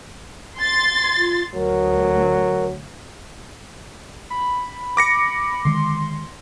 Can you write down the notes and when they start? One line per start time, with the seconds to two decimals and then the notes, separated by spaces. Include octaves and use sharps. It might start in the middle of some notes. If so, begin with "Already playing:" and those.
0.60 C6 A6
1.17 F4
1.54 D2 F#3 A#4
4.30 B5
4.97 D6 A#6 C#7
5.65 D3 D#3 G#3 C6